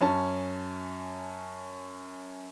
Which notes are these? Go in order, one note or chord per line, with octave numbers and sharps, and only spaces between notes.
F#2 C#4 A5